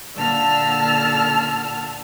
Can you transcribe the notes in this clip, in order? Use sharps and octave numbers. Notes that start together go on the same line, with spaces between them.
A#2 D3 A5 E6 F6